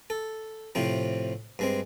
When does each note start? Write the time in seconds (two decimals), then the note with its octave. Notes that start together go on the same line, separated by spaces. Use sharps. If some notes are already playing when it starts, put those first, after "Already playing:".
0.10 A4
0.75 A2 C3 F3 C4
1.59 G2 G#3 C4